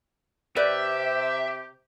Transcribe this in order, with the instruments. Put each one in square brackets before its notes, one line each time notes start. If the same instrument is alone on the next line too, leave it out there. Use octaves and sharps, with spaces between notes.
[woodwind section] C3 G4 [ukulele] B4 D5 [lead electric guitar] E5